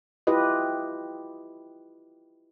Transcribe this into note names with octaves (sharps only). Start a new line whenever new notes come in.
E4 F4 G4 B4 D#5